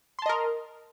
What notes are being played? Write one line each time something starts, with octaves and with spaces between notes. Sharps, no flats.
A#4 D#5 A5 C6